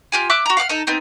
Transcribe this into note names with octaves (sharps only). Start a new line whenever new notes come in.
F4 G4 G#5
E5 D6 E6 F#6
F#4 A#5
F5 F#5 D6 F6
D#4 A4
B3 C4 D#4